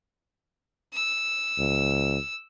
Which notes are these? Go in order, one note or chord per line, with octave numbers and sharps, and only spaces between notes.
E6
C#2